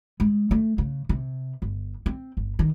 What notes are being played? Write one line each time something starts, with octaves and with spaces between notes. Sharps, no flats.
G#3
A3
C#3
C3
G1
C4
G1
D#3